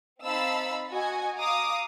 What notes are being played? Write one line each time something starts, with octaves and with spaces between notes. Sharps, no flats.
C4 D#4 F5 A5 B5 E6
F#4 D#5 G#5
F5 A#5 D6 D#6